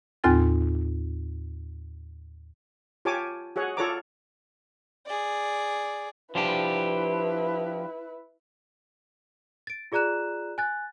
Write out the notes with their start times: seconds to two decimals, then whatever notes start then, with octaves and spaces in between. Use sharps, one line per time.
0.24 D#2 A2 C4 F4 G#5 A6
3.05 F4 G4 C#5 G#5 A5 D6
3.56 F#4 G#4 C#5 F#5
3.77 F4 A4 C#5 D5 A#5 D6
5.06 G#4 D5
6.35 F3 D4 E4 G4 B4
9.67 A6 D7
9.92 F4 G#4 D5 A#5 F#6 E7
10.58 G#5 F#6 A6